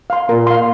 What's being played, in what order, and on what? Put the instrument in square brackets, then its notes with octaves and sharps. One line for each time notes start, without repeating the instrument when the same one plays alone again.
[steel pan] F5 C6
[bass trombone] A#2 [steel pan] A#4
[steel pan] F5 C6